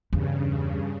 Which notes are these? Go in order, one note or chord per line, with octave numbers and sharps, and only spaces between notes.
E2 G2 C#3